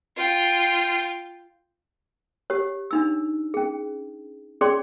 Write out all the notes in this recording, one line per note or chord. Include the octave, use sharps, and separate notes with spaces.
F4 G5
G4 C#5
D4 D#4 E6
C#4 G#4
C#4 G#4 C#5 D5 C6